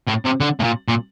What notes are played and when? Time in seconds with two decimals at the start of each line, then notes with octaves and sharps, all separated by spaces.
0.08 A2
0.25 C3
0.41 D3
0.60 A2
0.63 A#2
0.88 A#2